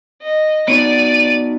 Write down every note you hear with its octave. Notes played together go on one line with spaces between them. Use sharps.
D#5
B3 D#4 F#4 D5 D#7